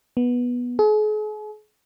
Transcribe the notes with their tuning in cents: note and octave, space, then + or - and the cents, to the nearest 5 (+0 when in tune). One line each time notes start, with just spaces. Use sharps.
B3 -10
G#4 +40